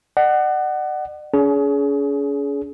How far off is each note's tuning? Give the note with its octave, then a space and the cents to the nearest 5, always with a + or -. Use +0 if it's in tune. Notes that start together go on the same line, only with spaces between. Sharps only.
D5 +45 F#5 +20
C#4 +40 G#4 +25